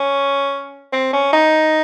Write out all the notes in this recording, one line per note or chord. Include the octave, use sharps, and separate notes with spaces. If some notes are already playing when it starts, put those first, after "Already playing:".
Already playing: C#4
C4
C#4
D#4